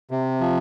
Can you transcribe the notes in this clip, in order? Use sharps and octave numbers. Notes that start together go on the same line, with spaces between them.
C3
F3